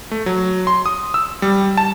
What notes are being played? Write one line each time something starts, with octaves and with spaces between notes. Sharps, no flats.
A3
F#3
C6
D#6
E6
G3
A5